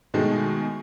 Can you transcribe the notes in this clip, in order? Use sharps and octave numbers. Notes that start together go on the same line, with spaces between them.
B2 D#3 G#3 A3